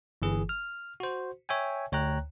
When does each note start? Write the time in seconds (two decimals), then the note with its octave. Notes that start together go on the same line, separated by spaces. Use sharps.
0.22 G1 E3 G#4
0.49 F6
1.00 F#4 C5
1.49 C#5 E5 G5 G#5
1.92 D2 C#5 G5 A#5 F#6